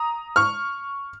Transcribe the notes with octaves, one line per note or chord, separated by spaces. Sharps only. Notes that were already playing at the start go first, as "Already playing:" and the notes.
Already playing: A#5 D#6
C#6 F6